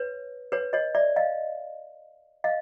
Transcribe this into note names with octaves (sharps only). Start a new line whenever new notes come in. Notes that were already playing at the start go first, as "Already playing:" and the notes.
Already playing: B4 C#5
B4 C#5
C#5 D#5
D5 E5
D#5 F5
D#5 F5